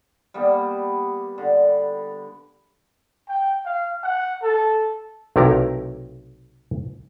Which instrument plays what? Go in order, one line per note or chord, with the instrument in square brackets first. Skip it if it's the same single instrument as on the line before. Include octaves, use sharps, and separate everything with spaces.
[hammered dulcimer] G3 A#3 B3 G4
D3
[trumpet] G5
F5
F#5
A4
[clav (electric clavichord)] B1 C3 A3 E4 A#4 A#5